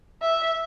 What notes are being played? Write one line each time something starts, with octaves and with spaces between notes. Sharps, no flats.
E5